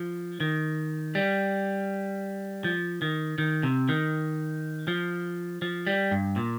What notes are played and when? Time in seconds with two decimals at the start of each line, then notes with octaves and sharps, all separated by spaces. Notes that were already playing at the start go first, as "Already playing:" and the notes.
Already playing: F3
0.40 D#3
1.15 G3
2.64 F3
3.02 D#3
3.38 D#3
3.63 C3
3.89 D#3
4.88 F3
5.62 F3
5.87 G3
6.11 G2
6.36 A#2